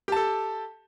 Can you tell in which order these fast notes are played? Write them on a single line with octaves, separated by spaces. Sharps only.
G4 A5 A4